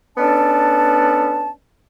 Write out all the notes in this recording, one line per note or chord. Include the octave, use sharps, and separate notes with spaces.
B3 C#4 D4 A4 D5 A5